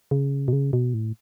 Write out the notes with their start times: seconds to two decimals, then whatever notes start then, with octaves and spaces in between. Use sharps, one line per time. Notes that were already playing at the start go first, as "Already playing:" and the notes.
0.11 C#3
0.48 B2
0.53 C#3
0.73 B2
0.94 A2